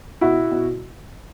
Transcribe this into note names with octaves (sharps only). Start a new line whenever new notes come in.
B2 E4 F#4
B2